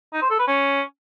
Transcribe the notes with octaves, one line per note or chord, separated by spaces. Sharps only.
D#4
C5
A4
B4
C#4